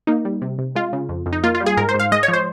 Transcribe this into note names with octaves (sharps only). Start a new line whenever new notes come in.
A#3 D#4
G3
C3
C3
G#3 F4
C#3
F2
F2
D#4
A#3 F4
F4
G3
G#4
G#2 A#4
C5
G#2
F5
G#3 D#5
C#5
F3
C5